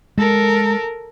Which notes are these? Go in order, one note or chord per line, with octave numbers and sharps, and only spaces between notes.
G#3 A4 A#4